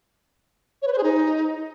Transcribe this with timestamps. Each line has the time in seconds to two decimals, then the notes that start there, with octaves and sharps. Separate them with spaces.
0.82 C#5
0.87 B4
0.93 C5
0.98 G#4
1.03 D#4